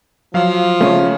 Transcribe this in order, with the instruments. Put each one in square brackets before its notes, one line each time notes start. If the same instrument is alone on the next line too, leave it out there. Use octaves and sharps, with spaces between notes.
[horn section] F3 [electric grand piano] F#3 F5
[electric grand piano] C#3 [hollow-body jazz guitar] A3 C#4